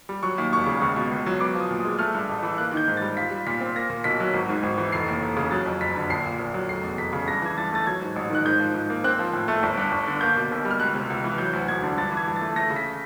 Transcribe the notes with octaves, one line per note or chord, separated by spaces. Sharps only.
G3
F#3 C#6
D#2
E1 C#6
C#3
C#2 C#6
B2
C#2
F#3
B3 D6
F3
D#6
A#2
D#6
G#3
A3 F6
G2
A1
E3
A#3 F#6
D#3
G6
G#2
G3 A6
F4 B6
G3
A#2 B6
C4
A#3 A#6
A#2
B1 B6
F#3
G#1
G#2
G#1
E3
F1 C7
D#2
F1
C#3
F#3 A6
F2
F#1 B6
D3
A#1 C7
A#2
A#1
F#3
F1 C7
E2
F1 B6
C#3
G2 A#6
E3 G#6
G2 A6
A3 A6
F#3 G#6
G#2
A1
D#3 F#6
G#2 G6
F3
G#2
A#3
C4 F#6
F3
A2
A3
G1
G2
G1
D3
A#3 G6
B2
B1
G3
F6
C#2 F#6
C3
C#2
E3
F#3 G6
D2
E1 G#6
D3
G2 A6
E3 G#6
G2
A6
A3
A3 A#6
C#3
B6